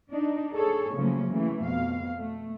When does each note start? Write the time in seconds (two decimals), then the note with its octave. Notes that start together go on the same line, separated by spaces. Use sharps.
0.11 D4 D#4
0.53 G#4 A4 C#5
0.95 C#3 F3 F#3 A3 A#3 C#4
1.30 C#3 E3 A3
1.63 F2 B2 F5
2.17 A3